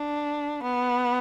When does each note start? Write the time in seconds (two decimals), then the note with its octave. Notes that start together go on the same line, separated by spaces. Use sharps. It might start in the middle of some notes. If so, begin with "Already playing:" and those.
Already playing: D4
0.63 B3